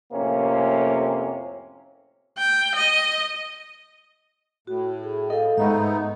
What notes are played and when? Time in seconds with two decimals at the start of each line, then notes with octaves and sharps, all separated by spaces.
0.13 F2 A2 C3 A#3 C#4
2.38 G5
2.75 D#5
4.67 A2 F#4
5.03 G#4
5.30 A4 D#5 F5
5.58 G#2 G#3 A3 B3 D#4 D#5